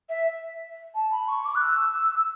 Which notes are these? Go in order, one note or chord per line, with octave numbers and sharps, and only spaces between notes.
E5
A5
B5
C#6
D6
F#6
E6